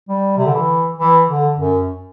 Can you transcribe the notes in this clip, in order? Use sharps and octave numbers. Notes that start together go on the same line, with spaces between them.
G3
C3
D3
E3
E3
D3
F#2